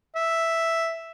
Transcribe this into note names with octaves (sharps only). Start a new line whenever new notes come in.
E5